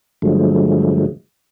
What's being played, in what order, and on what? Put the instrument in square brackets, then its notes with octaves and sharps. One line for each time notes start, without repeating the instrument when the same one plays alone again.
[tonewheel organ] G2 D3 F3 F#3 G#3 A3